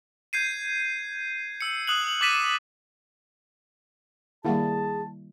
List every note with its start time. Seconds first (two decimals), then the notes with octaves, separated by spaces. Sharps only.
0.33 G6 G#6 C7 D#7
1.61 E6 C#7
1.87 D#6 F#6 F#7
2.21 D6 F#6 A6 B6 D#7 E7
4.45 D#3 G3 A#3 E4 G#4 F#5 A5